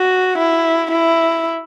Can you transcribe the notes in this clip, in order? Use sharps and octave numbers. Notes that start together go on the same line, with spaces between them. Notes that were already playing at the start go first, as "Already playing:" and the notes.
Already playing: F#4
E4
E4